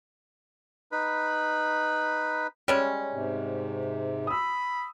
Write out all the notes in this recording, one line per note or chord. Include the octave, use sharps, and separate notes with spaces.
D#4 B4 B5
G3 G#3 C#4 C#5
G#2 C3
B5 D#6 E6